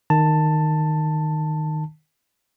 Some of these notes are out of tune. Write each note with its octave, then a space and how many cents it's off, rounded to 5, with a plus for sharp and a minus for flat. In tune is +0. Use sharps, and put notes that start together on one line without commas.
D#3 -10 A5 +10